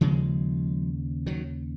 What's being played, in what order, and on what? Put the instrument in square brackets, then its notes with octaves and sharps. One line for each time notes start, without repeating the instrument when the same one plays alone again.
[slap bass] D#2 C#3 F3 G#3
D#3 F#3